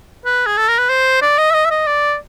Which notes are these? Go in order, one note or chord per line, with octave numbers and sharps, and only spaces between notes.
B4
G#4
A4
A#4
B4
C5
D5
D#5
E5
D#5
E5
D#5
D5